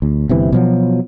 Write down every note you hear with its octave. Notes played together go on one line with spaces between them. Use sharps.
D2
G1 C3 E3
B2 F3 F#3